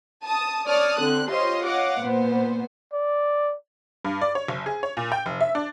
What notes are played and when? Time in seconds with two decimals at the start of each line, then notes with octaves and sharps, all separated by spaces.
0.24 A5 D#6
0.67 C#5 D5 A5 D#6 F6
1.00 D3 C4 F#6
1.30 F4 G4 C5 C#5 D#5 C6
1.66 C#5 D#5 F5 F#5 D6
1.99 A#2 B3 C5
2.93 D5
4.05 G2
4.21 D5
4.35 C#5
4.48 F#1
4.66 G#4
4.83 C#5
4.97 A#2
5.12 G5
5.26 F1
5.41 E5
5.55 D4